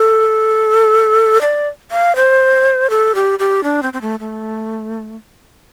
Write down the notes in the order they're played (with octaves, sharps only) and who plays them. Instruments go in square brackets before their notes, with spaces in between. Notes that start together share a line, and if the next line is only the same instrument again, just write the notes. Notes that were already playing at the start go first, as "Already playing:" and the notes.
Already playing: [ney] A4
D5
F5
C5
A4
G4
G4
D4
C4
C4
A3
A3